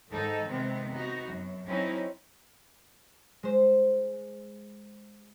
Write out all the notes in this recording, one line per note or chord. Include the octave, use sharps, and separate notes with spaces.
G#2 D#3 D#4 A4
C3 D#3 G#3 B3 C4
B3 D#4 F#4
F#2
F#3 C4 C#4 D#4 E4
G#3 C5